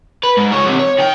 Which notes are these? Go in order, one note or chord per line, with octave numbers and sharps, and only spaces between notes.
B4
G#2
G#3 C#5
E2 C3
C#5
D#3 G5